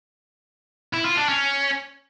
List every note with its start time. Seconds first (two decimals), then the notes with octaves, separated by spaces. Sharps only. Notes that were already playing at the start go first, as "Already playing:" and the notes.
0.93 E4
1.05 F4
1.17 D4
1.29 C#4